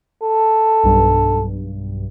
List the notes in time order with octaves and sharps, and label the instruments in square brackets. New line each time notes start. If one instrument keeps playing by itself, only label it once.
[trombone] A4
[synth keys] B1 G2